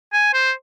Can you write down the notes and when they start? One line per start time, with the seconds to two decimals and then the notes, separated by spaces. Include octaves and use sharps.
0.13 G#5
0.33 C5